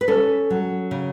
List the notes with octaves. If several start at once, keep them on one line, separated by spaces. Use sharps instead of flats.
B4
C#4 A4
F#3
C#3